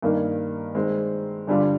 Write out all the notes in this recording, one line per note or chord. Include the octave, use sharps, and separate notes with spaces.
G2 D#3 A#3 D#4 A#4
D#3 G#3 C4
G2 D3 G3 D4 F4